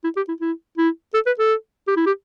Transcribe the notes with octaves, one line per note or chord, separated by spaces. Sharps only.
E4
G4
E4
E4
E4
A4
B4
A4
G4
E4
G4